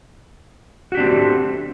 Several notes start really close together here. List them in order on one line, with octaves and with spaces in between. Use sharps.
F#4 G4 D4 C4 A3